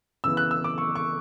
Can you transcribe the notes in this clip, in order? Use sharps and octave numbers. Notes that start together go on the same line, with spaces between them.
C#3 E3 B3 E6
F#6
E6
D6
C#6
C#6